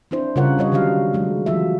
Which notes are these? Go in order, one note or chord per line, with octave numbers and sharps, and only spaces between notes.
C4 D4 E4 C5
C#3 G3 F4 A#4 C#5 F#5
C#3 G3 C#5 D#5
D3 D#3 F#3 F#4 F5
F#3 G#3 A3
E3 F#3 F4 E5